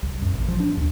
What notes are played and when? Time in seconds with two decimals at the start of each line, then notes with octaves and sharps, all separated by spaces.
0.03 C2
0.22 F#2
0.34 A1
0.48 F3
0.60 D4
0.77 D#2